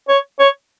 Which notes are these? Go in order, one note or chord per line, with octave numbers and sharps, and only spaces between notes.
C#5
C#5